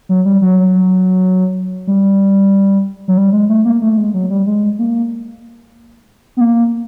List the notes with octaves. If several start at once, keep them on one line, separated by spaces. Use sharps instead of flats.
F#3
G3
F#3
G3
F#3
G3
G#3
A3
A#3
A3
G#3
F#3
G3
G#3
A#3
B3
A#3